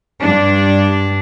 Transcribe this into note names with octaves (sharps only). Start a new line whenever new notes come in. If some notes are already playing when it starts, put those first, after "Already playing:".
G2 D4